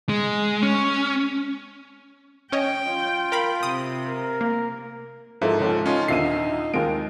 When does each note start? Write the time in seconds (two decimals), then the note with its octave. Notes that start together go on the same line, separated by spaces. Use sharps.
0.09 G#3
0.63 C#4
2.52 C#4 C#5 D#5 G5
2.86 F4
3.32 A#4 F5 B5
3.63 C3 D#6
4.08 A#4
4.41 A#3
5.42 G#2 F3 E4 A4 A#4 E5
5.60 C#2 F3 C#4
5.86 C#4 D#4 F4
6.08 D#2 A#2 D3 E5 C7 D#7
6.74 D#2 G#3 F4 A#4 D7